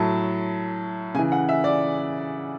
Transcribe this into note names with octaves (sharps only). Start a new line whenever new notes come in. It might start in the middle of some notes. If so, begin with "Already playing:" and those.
Already playing: A2 F#3 A5
C#3 E3 G#5
F#5
E5
D5